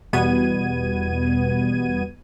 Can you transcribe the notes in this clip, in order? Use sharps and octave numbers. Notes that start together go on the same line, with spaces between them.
E2 B2 G3 B3 G#6 D#7